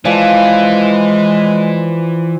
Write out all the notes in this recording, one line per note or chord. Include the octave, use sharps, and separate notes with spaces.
E3 F3 G#3 D5 G#5